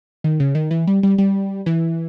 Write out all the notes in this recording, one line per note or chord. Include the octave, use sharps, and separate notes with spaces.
D#3
C#3
D#3
E3
G3
G3
G3
E3